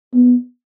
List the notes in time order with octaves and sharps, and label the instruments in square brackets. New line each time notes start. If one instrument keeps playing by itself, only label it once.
[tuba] B3